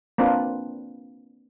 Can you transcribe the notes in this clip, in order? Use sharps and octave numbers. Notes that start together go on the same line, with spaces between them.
A#3 C4 D4 F4 B4